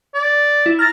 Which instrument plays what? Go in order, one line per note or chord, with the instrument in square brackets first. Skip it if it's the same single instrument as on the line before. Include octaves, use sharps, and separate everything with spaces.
[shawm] D5
[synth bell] E4
[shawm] A#5 [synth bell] F6 A6